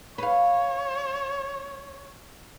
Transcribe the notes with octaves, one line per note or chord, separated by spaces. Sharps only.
B4 C#5 F5